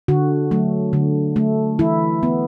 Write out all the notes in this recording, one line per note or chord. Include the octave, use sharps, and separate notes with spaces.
D3 F#4
F#3 A3
D3
A3
E3 E4
B3